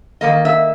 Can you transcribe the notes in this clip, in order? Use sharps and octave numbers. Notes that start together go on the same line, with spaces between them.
G3 A#3 D#5
D#3
E5